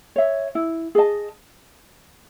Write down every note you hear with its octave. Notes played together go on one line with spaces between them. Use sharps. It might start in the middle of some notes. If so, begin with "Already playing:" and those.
C#5 E5
E4
G#4 D#5 A5